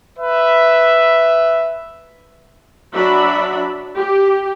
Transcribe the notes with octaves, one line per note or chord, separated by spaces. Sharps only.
B4 E5
F#3 D4 F#4 D5 E5 B5
G4